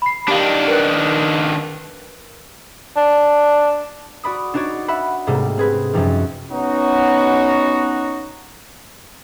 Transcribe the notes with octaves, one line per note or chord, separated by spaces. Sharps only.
B5 C7
D#3 D4 G4 F5
A#4 B4 F#6
D4
F#4 D5 B5 D#6
D4 D#4 F#4 C#5 D5 A6
E5 F#5 B5
G#2 C3 G3 A3 A#3
C4 G#4 B4
F#2 C3 F3 G3 D#4
B3 C#4 D#4 F#4